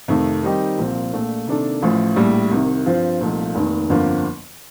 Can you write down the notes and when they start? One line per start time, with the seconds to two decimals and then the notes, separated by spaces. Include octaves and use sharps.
0.08 F2 C3 D#3 A3
0.43 D#3 G3 C4 D#4 G4
0.78 C2 A#2 F3 C4
1.13 A#1 A#2 A3
1.47 C3 D#3 A#3 D4 A4
1.82 A1 A2 F3
2.16 A#1 A2 G3
2.51 C2 C3 D#3
2.86 G2 F3 C4 F4 C5
3.21 C2 A#2 F3 A3 D#4
3.55 F1 D#2 D#3
3.89 G1 F2 D3 F3 A#3